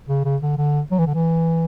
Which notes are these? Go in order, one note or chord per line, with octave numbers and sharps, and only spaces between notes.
C#3
C#3
D3
D3
F#3
E3
D3
E3